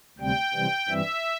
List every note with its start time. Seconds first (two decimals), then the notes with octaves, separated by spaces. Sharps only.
0.19 D2 C3 G3 C4 G5
0.54 C3 E3 G3 C4
0.89 G2 E3 G3 C4 E5